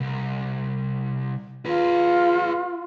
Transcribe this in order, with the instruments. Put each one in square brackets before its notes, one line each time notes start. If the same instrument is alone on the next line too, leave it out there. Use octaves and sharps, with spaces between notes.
[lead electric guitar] C2
[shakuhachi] F4 [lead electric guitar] G#4 B4